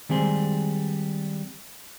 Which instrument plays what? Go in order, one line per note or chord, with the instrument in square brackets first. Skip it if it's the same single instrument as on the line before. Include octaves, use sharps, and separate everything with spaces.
[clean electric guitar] D#3 G3 G#3 C4 G#4 C5